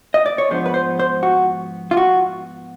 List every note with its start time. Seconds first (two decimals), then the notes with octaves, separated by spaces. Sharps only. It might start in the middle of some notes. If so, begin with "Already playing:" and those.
0.14 D#5
0.26 D5
0.38 C#5
0.50 G#2 F3 G#3 B3 D4 C5
0.66 B4
0.74 C5
1.00 C5
1.23 F#4
1.91 F4
1.97 F#4